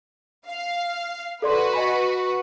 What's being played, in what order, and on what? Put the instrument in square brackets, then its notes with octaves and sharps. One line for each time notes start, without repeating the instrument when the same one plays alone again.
[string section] F5
[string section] F#4 B4 [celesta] A4 D5 C6
[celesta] D#5 G#5 B5